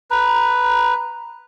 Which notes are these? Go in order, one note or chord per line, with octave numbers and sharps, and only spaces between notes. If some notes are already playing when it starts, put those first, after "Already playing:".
B4 A#5